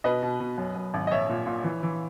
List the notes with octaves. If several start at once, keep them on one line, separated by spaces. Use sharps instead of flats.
B2 B4 D#5
B2
B2
F#2
F#2
G#1
D#5
A#1 C#5 E5
A#2
A#2
E3
E3